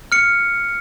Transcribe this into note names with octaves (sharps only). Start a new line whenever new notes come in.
F6 C#7